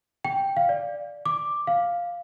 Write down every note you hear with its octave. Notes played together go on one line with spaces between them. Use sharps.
G5
F5
D5
D6
F5